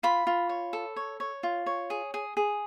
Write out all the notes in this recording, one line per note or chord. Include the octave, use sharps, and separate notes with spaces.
F4 B5
F4
C#5
A4
C#5
C#5
F4
C#5
G#4
G#4
G#4